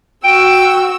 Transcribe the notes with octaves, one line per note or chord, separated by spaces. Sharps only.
F#4 G5 E6